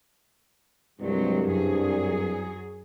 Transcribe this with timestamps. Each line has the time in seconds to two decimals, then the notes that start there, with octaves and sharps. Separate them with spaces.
1.01 C2 G2 F#3 G#3 C4
1.52 F#2 F#3 G#4